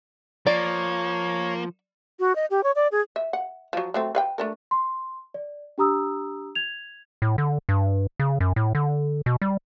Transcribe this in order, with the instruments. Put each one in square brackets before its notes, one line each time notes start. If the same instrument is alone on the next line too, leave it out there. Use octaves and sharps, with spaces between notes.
[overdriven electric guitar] F3 [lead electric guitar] A#3 [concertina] C#5 [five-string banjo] D5
[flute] F#4
D#5
G4
C#5
D5
G#4
[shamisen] E5
F#5
F3 F#3
F#3 A3 C4
B4 F5 G5
A3 D4 A#4
[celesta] C6
D5
D4 G4 A#5 D#6 E6
G#6 F7
[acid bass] A2
D3
G2
C#3
F#2
A2
D3
B2
G3